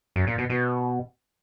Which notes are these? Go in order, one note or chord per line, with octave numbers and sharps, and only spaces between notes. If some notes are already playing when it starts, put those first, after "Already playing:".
F#2
A#2
B2
B2